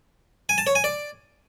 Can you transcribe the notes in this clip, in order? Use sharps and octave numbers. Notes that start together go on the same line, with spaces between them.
G#5
A5
C#5
G#5
D5